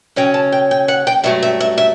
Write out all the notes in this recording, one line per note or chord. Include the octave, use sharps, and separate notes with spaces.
C#3 F#3 C#4 G5
A5
G5
G5
F#5
G5
G2 F#3 A3 E5
E5
E5
E5